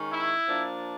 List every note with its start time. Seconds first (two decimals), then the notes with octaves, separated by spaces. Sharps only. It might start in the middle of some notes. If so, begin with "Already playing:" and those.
Already playing: D#3 G#3 C#4
0.11 E4
0.47 F3 A#3 D4